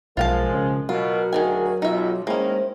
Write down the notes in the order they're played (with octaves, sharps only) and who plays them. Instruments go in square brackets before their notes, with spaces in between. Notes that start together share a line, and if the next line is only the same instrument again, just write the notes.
[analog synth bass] B1 [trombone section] F3 G#3 [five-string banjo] F4 F5 A5 [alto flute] A#4
[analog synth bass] C#3
[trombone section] B2 [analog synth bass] F#3 [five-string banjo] F4 [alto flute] A#4
[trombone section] D2 F#4 G#4 [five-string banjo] D#3 E3 G#5
[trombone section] B1 [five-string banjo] D#4 E5 [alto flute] F4
[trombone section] D#3 E4 [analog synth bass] G#3 [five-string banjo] A#3 C#4 [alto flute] C5